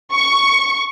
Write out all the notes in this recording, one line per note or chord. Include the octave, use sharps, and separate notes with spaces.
C#6